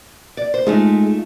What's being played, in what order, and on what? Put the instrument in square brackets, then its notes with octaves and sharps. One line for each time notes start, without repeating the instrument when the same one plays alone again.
[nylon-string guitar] D5
C5
[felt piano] G#3 [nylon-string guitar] A3 D#4 F4